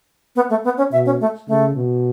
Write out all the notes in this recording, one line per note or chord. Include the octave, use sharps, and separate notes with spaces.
B3
A3
B3
C#4
B2 E5
C#4
A3
C#3 A3
B2